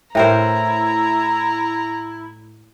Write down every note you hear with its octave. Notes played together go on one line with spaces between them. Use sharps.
A2 E4 A#4 C5 E5 G5 A#5